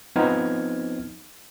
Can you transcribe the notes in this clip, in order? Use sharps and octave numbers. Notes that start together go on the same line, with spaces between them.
F3 B3 C4 D#4 F6 G#6